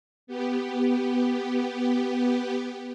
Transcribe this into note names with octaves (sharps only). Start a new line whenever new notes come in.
B3 G4